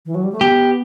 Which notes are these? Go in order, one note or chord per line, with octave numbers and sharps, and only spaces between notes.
E3
F#3
G3
A3
B3 G4